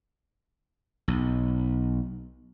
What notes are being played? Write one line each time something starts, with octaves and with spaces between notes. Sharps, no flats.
B1